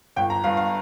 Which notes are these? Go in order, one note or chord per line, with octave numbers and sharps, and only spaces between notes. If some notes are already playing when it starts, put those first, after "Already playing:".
G1 G5
A#5
G2 F5
F5